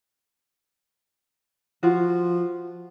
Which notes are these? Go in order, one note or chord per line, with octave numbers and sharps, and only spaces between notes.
F3 F4 F#4